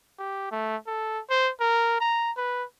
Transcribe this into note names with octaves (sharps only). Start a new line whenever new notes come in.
G4
A3
A4
C5
A#4
A#5
B4